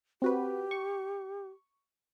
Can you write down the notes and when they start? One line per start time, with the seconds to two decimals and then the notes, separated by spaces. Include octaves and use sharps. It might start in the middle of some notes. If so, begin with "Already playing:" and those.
0.22 C4 F#4 G4 B4
0.71 C#6